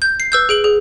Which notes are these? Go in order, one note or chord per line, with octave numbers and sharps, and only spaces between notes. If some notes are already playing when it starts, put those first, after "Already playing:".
G6
C7
B4 E6 G6
G#4 D7 F#7
G#4